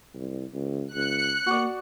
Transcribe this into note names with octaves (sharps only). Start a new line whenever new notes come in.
C2
C#2
C#2 F#6 C#7
A#3 F#4 D5